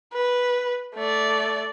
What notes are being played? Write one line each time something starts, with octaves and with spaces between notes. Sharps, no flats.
B4
A3 D5